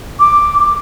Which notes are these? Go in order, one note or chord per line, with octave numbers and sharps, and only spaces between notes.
D6
D6